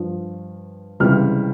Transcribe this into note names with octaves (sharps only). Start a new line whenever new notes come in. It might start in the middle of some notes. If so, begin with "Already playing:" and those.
Already playing: G2 F3
C#2 C3 E3 G3 F6